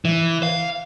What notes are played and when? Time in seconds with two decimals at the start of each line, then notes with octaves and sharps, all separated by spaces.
0.05 E3
0.43 F5